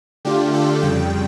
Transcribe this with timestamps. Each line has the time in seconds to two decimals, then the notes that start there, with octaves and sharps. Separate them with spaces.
0.25 D3 A3 D4 F4 G4
0.54 A4
0.82 F2 C#3 G3 G5